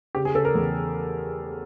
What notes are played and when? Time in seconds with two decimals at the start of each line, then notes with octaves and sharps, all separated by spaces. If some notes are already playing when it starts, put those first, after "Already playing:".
0.15 C#3 G4
0.25 G#4
0.35 C#3 A4
0.45 A#4
0.55 E2